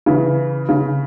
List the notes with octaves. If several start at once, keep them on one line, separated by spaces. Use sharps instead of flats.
C#3 E3
C#3